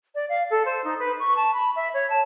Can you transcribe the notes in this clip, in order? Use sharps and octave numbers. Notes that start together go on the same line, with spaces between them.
D5
F5
A4
C5
D#4
B4
C#6
A5
B5
E5
C#5
A5